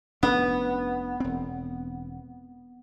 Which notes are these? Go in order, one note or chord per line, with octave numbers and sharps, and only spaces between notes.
F1 B3 C#4 D4
E1 C4